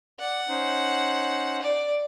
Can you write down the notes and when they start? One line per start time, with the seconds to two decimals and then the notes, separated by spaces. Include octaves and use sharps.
0.20 D5 F#5
0.49 C#4 D#4 C5
1.62 D5